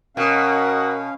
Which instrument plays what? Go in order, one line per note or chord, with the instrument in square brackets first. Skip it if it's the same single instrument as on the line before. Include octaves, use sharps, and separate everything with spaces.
[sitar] B2 [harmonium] C#4 F5 [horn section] F#4 D#5 F#5 [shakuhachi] A#4